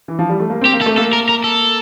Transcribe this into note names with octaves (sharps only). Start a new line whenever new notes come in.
E3
F3
G3
A3
A#3
C4 G4
A#3
A4
A3
A#3 A4
A#4
A#4
A4